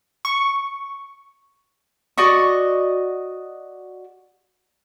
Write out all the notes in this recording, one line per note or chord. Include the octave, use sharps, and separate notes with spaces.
C#6
F#4 D5 D#5 C#6